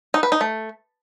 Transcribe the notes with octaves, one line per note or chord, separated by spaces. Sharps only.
D#4
B4
D#4
A3